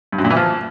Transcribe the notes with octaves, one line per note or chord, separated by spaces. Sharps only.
G2
F#2
A#2
E3
F3